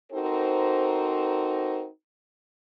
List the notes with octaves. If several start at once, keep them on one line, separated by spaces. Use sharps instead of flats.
C4 D#4 F#4 A4 A#4 C5